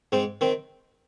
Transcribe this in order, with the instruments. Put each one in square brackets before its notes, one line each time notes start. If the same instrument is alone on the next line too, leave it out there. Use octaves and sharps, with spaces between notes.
[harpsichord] G#2 C4
D#3 C4